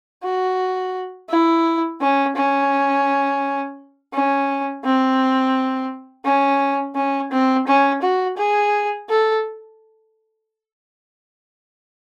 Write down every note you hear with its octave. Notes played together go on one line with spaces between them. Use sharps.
F#4
E4
C#4
C#4
C#4
C4
C#4
C#4
C4
C#4
F#4
G#4
A4